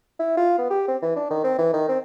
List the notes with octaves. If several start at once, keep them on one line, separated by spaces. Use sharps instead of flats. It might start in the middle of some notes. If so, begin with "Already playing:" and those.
E4
F4
B3
G4
C4
E3
D4
D#3
C4
E3
D#3
C4